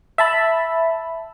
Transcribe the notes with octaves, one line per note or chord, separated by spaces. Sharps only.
E5 A5 B5